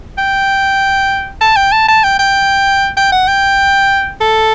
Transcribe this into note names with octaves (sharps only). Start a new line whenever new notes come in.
G5
A5
G5
A5
A5
G5
G5
G5
F#5
G5
A4